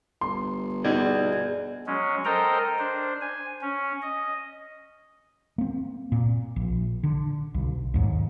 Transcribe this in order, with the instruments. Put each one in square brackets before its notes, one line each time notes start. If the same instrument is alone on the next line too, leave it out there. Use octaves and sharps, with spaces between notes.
[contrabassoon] G1 [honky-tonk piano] C6
[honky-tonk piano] B2 D#4 [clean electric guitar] G#4 D5
[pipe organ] F#3 G#3 C#4
A4 A#4 C5 D#5 G5 A#5
D4 C5
G#5
C#4
D#5
[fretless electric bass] A#3 C4
A#2
A#1
D3
B1
D#2 G#2